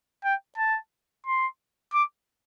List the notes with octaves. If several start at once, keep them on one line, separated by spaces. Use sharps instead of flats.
G5
A5
C6
D6